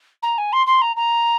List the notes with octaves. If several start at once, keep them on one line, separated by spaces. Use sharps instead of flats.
A#5
G#5
C6
C6
A#5
A#5